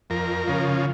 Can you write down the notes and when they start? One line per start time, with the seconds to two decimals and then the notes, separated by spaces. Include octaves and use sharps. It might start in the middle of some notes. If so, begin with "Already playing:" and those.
0.10 F2 A#4
0.48 C#3 F3